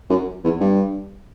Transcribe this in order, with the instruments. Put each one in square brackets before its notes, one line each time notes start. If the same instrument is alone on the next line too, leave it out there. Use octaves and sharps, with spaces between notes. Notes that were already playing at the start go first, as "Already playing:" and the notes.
[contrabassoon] F#2
E2
G2